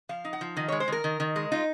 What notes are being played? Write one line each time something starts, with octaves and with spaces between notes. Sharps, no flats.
F3 F5
D#4
F#5
F3
D#3 D#5
G#3 C#5
C5
D#3 A#4
D#3
D#3
G#3
D#4 F4